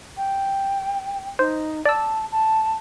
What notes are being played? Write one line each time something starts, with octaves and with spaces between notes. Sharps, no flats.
G5
D#4 C5
D5 A5 E6
A5